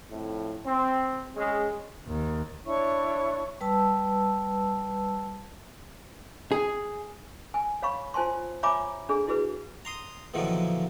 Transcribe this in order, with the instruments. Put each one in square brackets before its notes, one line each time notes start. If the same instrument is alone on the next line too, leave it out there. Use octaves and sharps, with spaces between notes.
[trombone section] F2 A2
C4
G#3 C#4 G#4
[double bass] D#2
[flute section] D4 E4 C#5 C#6
[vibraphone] G3 B4 A5 E6
[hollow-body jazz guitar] G#4
[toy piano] G#5
C#5 F5 B5 C#6
F4 C5 G#5 A5 C6
C#5 E5 G#5 A#5 B5 D6
D4 G#4 A4
E4 F#4 G#4 B4
[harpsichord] A#5 C6 D#6
E2 A#2 D3 D#3 F3 F#3